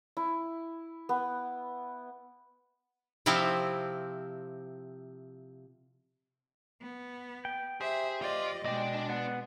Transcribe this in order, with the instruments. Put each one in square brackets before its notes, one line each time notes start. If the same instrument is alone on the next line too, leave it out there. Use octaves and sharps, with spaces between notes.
[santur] E4
B3
[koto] C3 F3 C4 E4 G4
[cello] B3
[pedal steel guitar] G5
[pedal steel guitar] G4 C5 [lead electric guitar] G#4 [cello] E5
[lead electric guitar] F4 [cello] D5 D#5
[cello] B2 G#3 [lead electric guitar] D4 D5 [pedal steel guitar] D#5 G5
[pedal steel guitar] B3 F#5